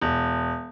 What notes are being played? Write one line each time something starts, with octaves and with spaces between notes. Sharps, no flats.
E1